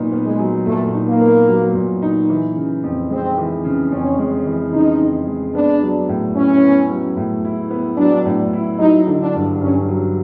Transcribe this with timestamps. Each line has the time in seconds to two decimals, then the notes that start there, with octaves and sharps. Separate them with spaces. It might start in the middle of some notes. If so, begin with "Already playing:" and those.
Already playing: A#2 F#3 B3 D#4
0.12 B3
0.26 G#3
0.39 F#3
0.66 A#2 A3
0.93 D#4
1.07 A#3
1.20 B3
1.48 F#3
1.74 A#2
2.02 D#4
2.30 E3
2.56 C#3
2.84 F2
3.10 G#3 C4
3.38 E3
3.64 C#3
3.92 F2 C#4
4.19 G#3
4.45 E3
4.73 C#3 D#4
5.00 F2
5.27 G#3
5.55 B3 D4
5.82 F#3
6.09 A2
6.35 C#4 E4
6.63 B3
6.90 F#3
7.17 A2
7.45 E4
7.71 B3
7.98 F#3 D4
8.26 A2
8.53 E4
8.79 F#3 D#4
9.07 D3
9.20 D4
9.34 G2
9.61 G2 C#4
9.88 F#3